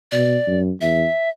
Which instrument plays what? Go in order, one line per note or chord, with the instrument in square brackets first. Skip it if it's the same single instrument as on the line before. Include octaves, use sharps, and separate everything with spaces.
[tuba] B2 [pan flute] D5
[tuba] F#2
[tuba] E2 [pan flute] E5